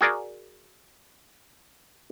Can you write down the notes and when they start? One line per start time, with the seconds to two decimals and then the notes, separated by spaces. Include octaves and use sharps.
0.01 F#4 G#4 A#4 D5